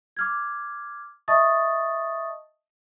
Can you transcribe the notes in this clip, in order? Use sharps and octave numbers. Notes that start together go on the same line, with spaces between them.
D6 F6 G#6
D#5 E5 A5 C#6 D#6 A6